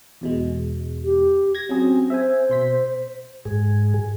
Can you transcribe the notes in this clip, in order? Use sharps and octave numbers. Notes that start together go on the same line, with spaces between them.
E2 B2 G#3
G4
G#6 A#6
F#3 C4 C#4 G#4
C5 E5 G#5
B2 C6 B6
G#2 G#4